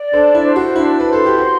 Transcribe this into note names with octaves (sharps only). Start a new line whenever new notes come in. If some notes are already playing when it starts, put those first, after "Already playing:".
Already playing: D5
D4 A4 C5
E4
C5
F#4
D4 E4
B4
A4 C5
G4
F#4 C6